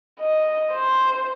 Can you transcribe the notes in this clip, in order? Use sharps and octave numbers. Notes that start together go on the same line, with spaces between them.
D#5
C5